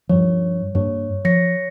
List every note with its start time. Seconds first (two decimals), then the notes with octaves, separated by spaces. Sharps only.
0.09 G2 F3 C#5
0.75 G2 A#3 D4 C#5
1.25 F3 C#5 A#6 C#7